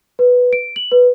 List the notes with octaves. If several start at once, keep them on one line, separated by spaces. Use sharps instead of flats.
B4
D7
F#7
B4